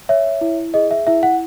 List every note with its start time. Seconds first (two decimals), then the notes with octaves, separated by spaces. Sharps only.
0.09 C#5 E5
0.41 E4
0.74 G#4 D#5
0.91 E5
1.07 E4 E5
1.23 F#5